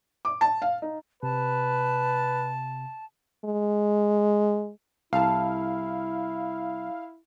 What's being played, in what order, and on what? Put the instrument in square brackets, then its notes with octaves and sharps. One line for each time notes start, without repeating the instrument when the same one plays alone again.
[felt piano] D6
A5
F5
D#4
[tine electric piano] C3 [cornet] B4 [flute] A5
[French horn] G#3
[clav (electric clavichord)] C2 [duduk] E4 [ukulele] A4 A5 [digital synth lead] F5